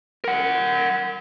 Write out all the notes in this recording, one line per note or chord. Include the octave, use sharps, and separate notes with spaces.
A#4 F#5